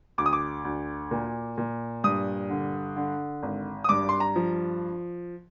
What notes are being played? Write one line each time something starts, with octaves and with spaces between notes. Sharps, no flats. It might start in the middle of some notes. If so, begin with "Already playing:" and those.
D2 D6
D#6
D6
D2
A#2
A#2
G2 D#6
D3
D3
G#1
D#6
G2 D6
C6
A#5
F3